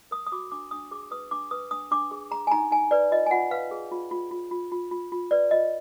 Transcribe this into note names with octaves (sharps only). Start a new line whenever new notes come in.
A#4 D#6
D#6
F#4 D6
D4 D6
D4 D#6
G#4 D6
B4 D#6
D4 D6
B4 D#6
D4 D#6
D4 D6
G#4
G#4 A#5
G#5
D#4 A#5
D#4 G#5
B4 D5
F4 D#5
G#5
F4 F#5
B4 F5
G#4
F4
F4
F4
F4
F4
F4
F4
B4 D5
F4 D#5